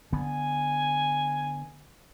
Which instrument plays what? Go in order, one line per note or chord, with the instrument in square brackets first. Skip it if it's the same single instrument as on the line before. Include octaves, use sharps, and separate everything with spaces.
[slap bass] D3 B3 [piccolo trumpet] G#5